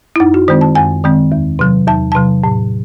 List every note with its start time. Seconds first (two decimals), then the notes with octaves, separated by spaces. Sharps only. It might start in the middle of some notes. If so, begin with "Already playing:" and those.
0.16 E4
0.20 F#2 D#4
0.34 F#4
0.48 D#3 G#3 C4 C5
0.61 A5
0.75 F#2 G#5
1.04 D#3 G#3 C4
1.32 E2
1.59 C3 F#3
1.88 E2 A5
2.12 C3 F#3 A5
2.44 A2